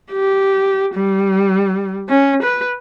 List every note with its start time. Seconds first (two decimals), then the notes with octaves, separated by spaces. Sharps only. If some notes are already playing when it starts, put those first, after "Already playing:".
0.12 G4
0.94 G3
2.09 C#4
2.43 B4